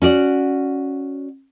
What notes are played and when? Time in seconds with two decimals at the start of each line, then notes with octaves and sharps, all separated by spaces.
0.02 C#4 F#4 D5